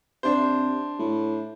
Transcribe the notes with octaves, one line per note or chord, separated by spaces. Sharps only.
C3 D4 C5
A2